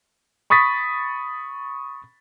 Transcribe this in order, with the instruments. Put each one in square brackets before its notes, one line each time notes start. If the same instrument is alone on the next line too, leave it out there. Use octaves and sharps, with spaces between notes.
[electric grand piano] B5 C#6 D#6 A6 B6